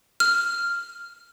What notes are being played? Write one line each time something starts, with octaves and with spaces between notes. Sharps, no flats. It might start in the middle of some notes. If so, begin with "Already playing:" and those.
F6